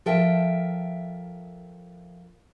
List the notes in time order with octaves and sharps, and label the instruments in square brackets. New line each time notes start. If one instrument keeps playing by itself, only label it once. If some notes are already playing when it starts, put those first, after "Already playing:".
[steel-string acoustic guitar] F3 A4 A#4 E5 G5